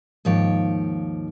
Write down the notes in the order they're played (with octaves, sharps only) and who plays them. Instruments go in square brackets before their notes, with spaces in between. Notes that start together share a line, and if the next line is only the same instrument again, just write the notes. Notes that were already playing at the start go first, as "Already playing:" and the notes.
[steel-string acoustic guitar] D#2 G#2 F3 C#5 G5